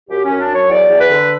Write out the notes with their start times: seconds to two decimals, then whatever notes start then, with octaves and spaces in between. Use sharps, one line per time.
0.09 F#2 G4
0.25 F#2 C#4
0.39 D4
0.49 F#3 C#5
0.69 E2 D5
0.89 E2
0.99 B4
1.09 D3